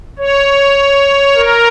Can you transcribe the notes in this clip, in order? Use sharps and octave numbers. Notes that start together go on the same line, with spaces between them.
C#5
A#4